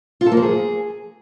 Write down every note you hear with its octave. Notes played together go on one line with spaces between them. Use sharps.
F4
A4
A#3
F3
G#4